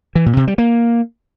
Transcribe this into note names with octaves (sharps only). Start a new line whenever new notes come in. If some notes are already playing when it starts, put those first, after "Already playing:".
E3
A#2
C3
G3
A#3